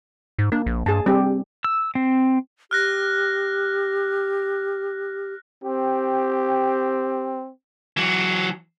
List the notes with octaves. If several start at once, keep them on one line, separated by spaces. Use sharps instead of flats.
G#2
A#3 D4
A#1
G2 G#4 A5
G3 C4 G4
E6
C4
G4 F6 F#6 A#6
C4 G4
E3 F#3